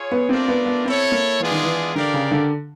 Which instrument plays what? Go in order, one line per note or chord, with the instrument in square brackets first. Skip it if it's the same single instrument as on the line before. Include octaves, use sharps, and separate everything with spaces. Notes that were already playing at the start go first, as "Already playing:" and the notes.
Already playing: [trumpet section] F4 G#4 C#5
[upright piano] B3
[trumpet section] A3 D4 F4 A#4 D5 [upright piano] C4
[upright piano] B3
B3
[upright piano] C4 [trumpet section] E4 A4 C#5
[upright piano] A#3
[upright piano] E3 [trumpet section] G#3 B3 D4 F4 G#4
[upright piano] D#3
E3
[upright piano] D3 [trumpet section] D4 G4 A#4 D5 F5
[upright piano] C#3
D3